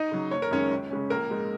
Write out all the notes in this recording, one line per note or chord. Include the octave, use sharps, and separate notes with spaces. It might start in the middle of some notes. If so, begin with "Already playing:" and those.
Already playing: D#4 D#5
C#3 F#3
F#1 C#5
A#4
F#2 D#3 G#3 C#4 C#5
C#2
C#3 G#3 C#4
A#1 A#3 A#4
G#2 G#3 D#4